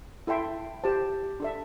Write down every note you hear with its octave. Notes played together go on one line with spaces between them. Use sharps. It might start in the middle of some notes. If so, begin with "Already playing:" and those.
E4 A4 E5 G5 C6
G4 C5 A5
D4 A4 E5